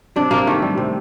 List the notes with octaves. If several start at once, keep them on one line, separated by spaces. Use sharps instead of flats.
C3 D4
C3 A#3
D#3 A3
G3
C3